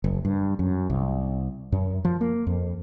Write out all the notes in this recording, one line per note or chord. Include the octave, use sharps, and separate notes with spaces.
F#1
G2
F#2
C2
F#2
F3
A#3
F2